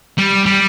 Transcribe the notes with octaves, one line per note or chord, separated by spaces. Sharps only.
G3
G3